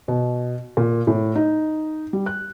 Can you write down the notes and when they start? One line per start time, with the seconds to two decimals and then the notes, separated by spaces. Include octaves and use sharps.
0.08 B2
0.77 A#2
1.07 A2
1.36 D#4
2.13 G3
2.26 F#6